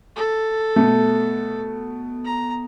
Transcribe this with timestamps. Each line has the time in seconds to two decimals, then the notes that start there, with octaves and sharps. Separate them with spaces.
0.16 A4
0.76 B2 A3
2.25 A#5